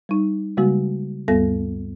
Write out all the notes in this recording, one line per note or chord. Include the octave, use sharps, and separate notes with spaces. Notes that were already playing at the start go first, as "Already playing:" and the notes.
G3 D#4
C#3 G3 G#3 A#3 F#4
D2 G2 G3 B3 A4 A#6